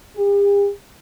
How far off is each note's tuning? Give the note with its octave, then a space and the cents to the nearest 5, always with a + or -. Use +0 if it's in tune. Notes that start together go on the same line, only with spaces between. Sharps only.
G4 +45